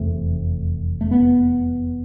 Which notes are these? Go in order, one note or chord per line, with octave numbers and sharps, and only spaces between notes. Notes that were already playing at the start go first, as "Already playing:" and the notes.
Already playing: F1 E2 C3 A3
A3
B3